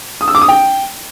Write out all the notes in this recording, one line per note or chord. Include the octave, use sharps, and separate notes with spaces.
D#6
E6
D6
D#6
G5